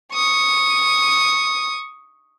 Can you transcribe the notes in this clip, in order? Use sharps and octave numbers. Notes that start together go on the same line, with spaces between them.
C#6 D#6